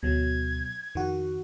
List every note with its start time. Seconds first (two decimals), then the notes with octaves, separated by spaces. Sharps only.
0.03 D2 B2 F#3 G#6
0.95 F2 D#3 F#4